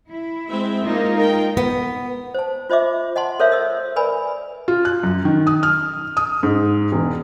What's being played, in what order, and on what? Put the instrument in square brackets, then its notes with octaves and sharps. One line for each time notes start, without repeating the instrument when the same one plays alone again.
[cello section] E4
[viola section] G#3 C4 E5
[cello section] G#3 D#4 F4 [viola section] A#3
[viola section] A#4 G5
[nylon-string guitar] B3
[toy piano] C5 A5
F4 C5 D#5 E5 D6
D#5 F#5 A5 C6
A4 A#4 C5 C#5 E5 F5
D#5 E6
A#4 B4 D5 G#5 B5
[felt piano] F4
F#6
F#2
D#3
D#6
F6
D#6
G#2
E1